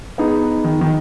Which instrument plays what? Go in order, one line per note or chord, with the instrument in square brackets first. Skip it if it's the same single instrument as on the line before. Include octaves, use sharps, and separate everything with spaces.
[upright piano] B3 D#4 G#4
[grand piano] D#3
D#3